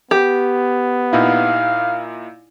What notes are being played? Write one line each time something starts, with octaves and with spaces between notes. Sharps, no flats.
B3 G4
A#2 D#4 E4 F5